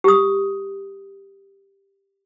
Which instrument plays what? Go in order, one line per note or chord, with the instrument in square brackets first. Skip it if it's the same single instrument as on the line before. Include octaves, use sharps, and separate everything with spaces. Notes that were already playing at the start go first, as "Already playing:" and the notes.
[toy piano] G4 D#6